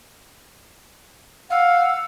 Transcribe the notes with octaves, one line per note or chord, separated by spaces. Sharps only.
F5 F#5 E6